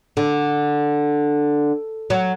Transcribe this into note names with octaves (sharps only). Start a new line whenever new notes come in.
D3
F#3